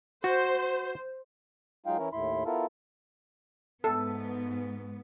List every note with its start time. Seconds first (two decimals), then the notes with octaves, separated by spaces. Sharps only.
0.24 F#4 C5
1.86 F#3 G#3 D#4 F4 F5 G5
1.98 E3 C#4 E4 A#4
2.13 D#2 A2 E4 B5 C6
2.46 B3 E4 F4 A4 A#4
3.84 G#2 B3 A4